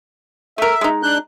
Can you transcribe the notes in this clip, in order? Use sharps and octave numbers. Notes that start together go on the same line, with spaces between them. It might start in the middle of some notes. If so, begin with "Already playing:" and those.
A3 A#4 E5
G#3 D#4
D4 F#6 G6